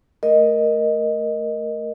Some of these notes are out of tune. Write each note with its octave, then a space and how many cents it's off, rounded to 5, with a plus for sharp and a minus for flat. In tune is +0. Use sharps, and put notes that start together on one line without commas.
A3 +0 A#4 +0 D#5 +0